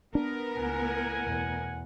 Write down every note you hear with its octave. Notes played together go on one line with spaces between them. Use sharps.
B3 D4 A#4
C#2 A2 F#5 G#5
E2 B2